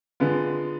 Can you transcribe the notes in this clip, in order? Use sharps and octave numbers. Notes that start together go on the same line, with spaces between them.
D3 G#3 B3 F4